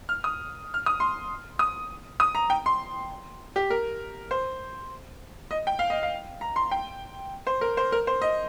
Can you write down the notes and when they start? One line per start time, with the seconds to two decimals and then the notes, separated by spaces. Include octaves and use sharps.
0.09 F6
0.24 D#6
0.74 F6
0.86 D#6
1.00 C6
1.59 D#6
2.20 D#6
2.35 A#5
2.50 G5
2.66 C6
3.56 G4
3.70 A#4
4.31 C5
5.51 D#5
5.67 G5
5.79 F5
5.90 D#5
6.03 F5
6.41 A#5
6.56 C6
6.71 G5
7.47 C5
7.61 A#4
7.77 C5
7.92 A#4
8.07 C5
8.22 D#5